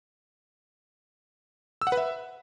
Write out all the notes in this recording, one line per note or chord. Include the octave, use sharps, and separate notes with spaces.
E6
F#5
B4
E5